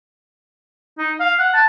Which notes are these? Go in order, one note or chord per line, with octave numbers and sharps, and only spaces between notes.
D#4
F5
F#5
A5